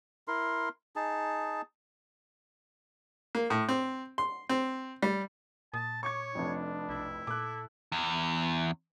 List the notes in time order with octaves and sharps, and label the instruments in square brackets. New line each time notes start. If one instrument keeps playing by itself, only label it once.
[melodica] E4 A#4 C6
D#4 G#4 A5
[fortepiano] A#3
A2
C4
C6
C4
G3
[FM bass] A#2 [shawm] A5 [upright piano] D#6
[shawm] C#5 [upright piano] C#6 D6 G#6
[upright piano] F1 F2 [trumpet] D4
[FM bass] B1 [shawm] E4
[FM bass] A#2 [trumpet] A4 [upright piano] D6 F#6
[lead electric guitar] E2